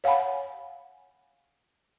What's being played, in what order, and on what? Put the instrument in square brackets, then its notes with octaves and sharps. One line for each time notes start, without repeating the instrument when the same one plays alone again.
[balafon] C#5 F5 F#5 G#5 B5